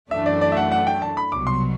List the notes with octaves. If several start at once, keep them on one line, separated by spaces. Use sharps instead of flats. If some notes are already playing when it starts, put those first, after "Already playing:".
F#2 E3 A3 D4 E5
D5
D5
E5
F#5
F#5
G5
A5
B5
C2 B2 F#3 D6
C6